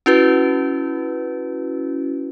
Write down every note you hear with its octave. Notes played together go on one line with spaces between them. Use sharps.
C#4 E4 F#4 B4